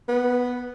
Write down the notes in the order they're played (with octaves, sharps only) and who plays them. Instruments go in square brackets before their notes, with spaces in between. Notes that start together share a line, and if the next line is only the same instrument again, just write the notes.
[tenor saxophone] B3